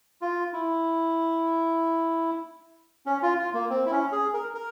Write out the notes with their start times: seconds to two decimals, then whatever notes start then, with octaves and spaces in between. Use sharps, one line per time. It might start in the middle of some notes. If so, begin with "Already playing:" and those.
0.22 F4
0.53 E4
3.06 C#4
3.23 F4
3.39 F4
3.54 A#3
3.70 C4
3.86 E4
3.91 C#4
4.12 G#4
4.33 A#4
4.54 A#4